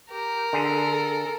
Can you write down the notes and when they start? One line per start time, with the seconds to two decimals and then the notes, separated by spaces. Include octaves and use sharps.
0.10 G4 A#4
0.53 D3 G#4 A4